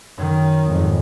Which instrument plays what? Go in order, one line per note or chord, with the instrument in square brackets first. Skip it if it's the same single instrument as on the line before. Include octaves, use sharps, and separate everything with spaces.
[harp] F#2 [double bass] D#3
[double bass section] F2 G#2